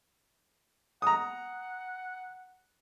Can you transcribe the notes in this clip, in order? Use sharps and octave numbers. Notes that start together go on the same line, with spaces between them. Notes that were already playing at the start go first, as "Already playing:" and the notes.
F#5 A#5 D#6